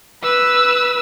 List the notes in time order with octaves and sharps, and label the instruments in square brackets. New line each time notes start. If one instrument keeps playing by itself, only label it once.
[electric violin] B4 E6